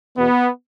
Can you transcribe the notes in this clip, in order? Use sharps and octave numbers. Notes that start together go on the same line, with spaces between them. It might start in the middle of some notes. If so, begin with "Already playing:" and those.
E2 B2 B3